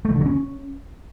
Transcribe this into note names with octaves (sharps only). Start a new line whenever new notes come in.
A3
E3
D3
F#3
C#4